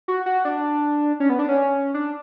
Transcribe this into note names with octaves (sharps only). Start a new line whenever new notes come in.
F#4
F#4
D4
C#4
B3
D4
C#4
D4